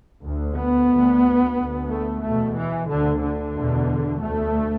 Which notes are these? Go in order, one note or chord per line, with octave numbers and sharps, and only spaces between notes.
D2
B3
D2
D2
A3
E2 B2 A3
E3
D2 D3
D3
E2 B2
D2 A3